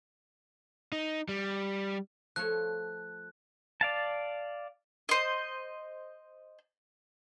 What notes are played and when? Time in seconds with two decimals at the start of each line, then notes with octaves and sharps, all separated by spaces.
0.92 D#4
1.29 G3
2.36 F3 A3 C#5 F#6
3.81 D5 F5 A5
5.09 C5 D#5